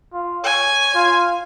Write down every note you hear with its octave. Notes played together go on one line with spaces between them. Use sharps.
F4
C#5 G#5
F4